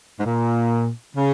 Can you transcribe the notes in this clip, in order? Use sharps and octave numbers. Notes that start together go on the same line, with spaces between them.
G#2
A#2
C#3